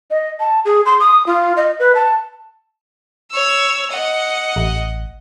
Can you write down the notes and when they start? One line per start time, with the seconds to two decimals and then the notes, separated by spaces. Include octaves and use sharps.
0.11 D#5
0.40 A5
0.65 G#4
0.86 C6
1.00 D#6
1.26 F4
1.57 D#5
1.79 B4
1.95 A5
3.31 C#5 E6
3.91 D#5 F#5
4.56 A1